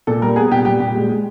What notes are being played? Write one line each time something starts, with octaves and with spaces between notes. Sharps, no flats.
A#2 A4
G3 A#4
B3 G#4
A#2 G4
G3 G4
A#2 G4
G#3
G#3